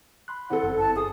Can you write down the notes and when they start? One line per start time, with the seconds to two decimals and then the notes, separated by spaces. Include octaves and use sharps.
0.28 B5 C6 F#6
0.50 E2 C4 A4 F#5
0.63 G1 F#2
0.79 A5
0.96 G#4 D#6